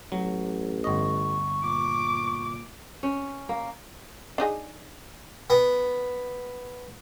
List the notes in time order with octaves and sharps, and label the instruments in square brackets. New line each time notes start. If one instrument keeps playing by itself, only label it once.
[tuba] A1 [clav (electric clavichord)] F#3
[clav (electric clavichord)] G1 D#5 [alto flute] C#6
[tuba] A#2 [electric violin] D6
[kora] C#4
A#3
[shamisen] D4 D#4 G#4
[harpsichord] B3